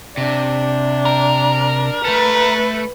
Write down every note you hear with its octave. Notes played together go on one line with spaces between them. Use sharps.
C3 D4
A#4
A3 A4 B4